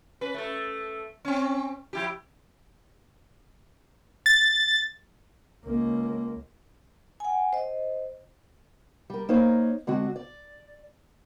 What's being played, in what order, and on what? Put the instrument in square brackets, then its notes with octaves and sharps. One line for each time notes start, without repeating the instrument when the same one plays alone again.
[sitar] C#4 B4
A3 A4
C4 C#4
F3 E4 G4
[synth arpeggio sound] A6
[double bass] C#2 A#3
[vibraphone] F#5 G#5
C5 D#5
[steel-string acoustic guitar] G3 A#4
A#3 D#4 C5 C#5
D3 G#3 C4 F#4
D5